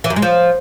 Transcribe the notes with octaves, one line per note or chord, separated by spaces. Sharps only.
E3
F#2
G#3
F3